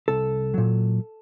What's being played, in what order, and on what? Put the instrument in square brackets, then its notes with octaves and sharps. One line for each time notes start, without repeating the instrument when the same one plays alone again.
[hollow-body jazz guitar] C2 A4
A#2 F#3